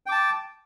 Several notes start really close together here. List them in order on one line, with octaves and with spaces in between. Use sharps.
G5 D6 A5